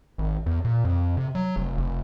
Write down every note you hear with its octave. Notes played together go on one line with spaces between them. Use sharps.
G#1
E2
A#2
F2
C3
F#3
F1
F1